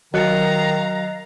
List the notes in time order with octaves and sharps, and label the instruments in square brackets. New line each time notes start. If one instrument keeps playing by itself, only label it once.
[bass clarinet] D#3 [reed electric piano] F#3 [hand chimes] D#5 F#6 C#7 [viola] F5 A#5